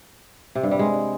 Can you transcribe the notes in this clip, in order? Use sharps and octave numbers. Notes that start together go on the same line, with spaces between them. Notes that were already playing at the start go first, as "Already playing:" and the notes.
C3
G2
G3
G#3